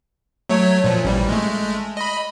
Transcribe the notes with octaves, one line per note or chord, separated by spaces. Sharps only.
F#3 A3 C#5
A#2 F3
A1 G3
G#3 A3
D#5 B5